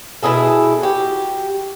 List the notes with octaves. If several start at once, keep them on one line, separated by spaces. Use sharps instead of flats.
B2 E4 G#4 A4
F#4 G4